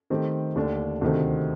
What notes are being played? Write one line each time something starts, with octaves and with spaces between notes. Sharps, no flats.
D#3 A3 C4 G4
D#2 D3 A3 D4
D2 C3 D#3 A3 C4